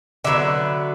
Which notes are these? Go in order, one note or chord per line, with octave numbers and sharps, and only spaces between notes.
D3 F#3 B3 E5